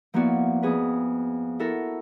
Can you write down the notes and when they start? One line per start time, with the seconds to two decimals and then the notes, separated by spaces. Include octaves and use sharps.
0.14 F3 A#3 B3 E4 F#4 D5
0.62 F2 B3 G#4 B4
1.59 E4 F#4 A4 A#4